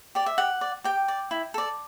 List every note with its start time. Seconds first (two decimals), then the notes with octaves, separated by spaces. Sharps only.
0.15 G4 D5
0.26 E5
0.38 G4 F#5
0.61 D5
0.84 G4 G5
1.08 D5
1.31 E4
1.54 A4 D5